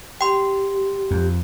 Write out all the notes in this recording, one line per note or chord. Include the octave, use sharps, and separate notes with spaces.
G4 G5 C6
F2